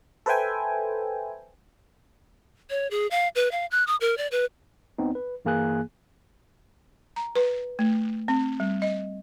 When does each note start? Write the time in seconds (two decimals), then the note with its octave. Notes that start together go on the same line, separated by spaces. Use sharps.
0.26 A4 B4 C5 E5 G5 G#5
2.70 C#5
2.91 G#4
3.11 F5
3.35 B4
3.51 F5
3.71 F#6
3.87 D#6
4.01 A#4
4.17 D5
4.31 B4
4.98 D2 B3 C4 D#4
5.15 B4
5.45 G2 E3 A#3 G#4 G#5 F#6
7.16 A#5
7.36 B4
7.79 A3
8.28 C4
8.60 G3
8.82 D#5